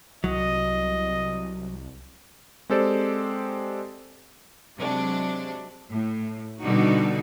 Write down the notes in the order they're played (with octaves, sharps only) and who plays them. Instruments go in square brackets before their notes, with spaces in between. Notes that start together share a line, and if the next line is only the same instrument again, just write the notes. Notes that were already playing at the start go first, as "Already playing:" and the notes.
[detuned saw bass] C2 [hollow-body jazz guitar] F#3 [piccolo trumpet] D#5
[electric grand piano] G#3 C4 G4 A4 C5 D5
[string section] C3 F#3 G#3 D4
[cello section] A2
B2 D3 G3 D4 D#4 F#4